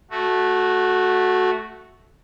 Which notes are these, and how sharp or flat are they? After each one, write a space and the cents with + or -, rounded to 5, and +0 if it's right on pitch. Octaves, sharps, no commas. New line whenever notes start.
A3 -10 F#4 +0